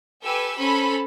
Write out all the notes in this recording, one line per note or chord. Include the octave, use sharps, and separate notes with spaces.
G4 A4 B4 G#5 E6
C#4 A4 C5 B5